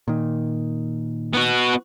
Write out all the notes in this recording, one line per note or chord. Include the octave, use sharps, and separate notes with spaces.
A#2 D#3
B3 F#4